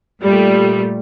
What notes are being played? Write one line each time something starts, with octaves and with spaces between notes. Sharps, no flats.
A#2 G3 A3